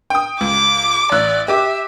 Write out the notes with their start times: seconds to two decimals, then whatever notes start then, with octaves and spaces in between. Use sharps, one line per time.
0.10 G5 D#6
0.41 C#2 D6
1.12 A1 D5 E6 F#6
1.48 G4 E5 D6